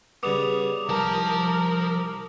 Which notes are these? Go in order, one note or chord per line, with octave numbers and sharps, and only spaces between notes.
C#3 G3 B3 D6 D#6 F7
C2 F3 A#4 A5